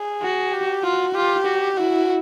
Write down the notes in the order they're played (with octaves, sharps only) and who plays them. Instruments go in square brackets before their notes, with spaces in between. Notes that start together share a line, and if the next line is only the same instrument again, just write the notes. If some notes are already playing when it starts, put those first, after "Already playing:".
Already playing: [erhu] G#4
[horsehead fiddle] F#4
[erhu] G4
[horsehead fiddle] F4 [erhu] F#4
[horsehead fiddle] F4 [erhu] G4
[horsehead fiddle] F#4
[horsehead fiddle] E4 [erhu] F#4